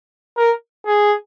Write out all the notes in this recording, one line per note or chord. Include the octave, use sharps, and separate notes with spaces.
A#4
G#4